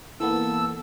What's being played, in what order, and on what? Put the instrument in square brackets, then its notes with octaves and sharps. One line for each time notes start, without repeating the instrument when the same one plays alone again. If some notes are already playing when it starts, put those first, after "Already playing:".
[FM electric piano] E3 A#3 B3 [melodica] A4 E6